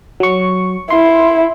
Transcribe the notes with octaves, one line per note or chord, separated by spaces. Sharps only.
F#3 C#6
E4 C6